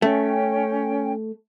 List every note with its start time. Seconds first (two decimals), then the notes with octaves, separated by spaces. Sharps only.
0.02 A3 C#4 G5